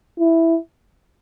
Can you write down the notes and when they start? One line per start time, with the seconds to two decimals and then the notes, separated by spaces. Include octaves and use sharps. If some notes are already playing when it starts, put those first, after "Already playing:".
0.19 E4